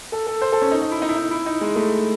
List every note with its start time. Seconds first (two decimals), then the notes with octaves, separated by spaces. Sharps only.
0.12 A4
0.27 A4
0.42 C5
0.52 A4
0.62 C#4
0.72 D#4
0.82 D#4
0.91 E4
1.02 D#4
1.09 E4
1.16 D#4
1.31 E4
1.46 D#4
1.61 G#3
1.76 A3